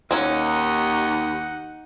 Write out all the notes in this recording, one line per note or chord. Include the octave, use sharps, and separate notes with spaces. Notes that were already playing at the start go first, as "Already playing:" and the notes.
D#2 A#3 C#4 D#4 C#5 F#5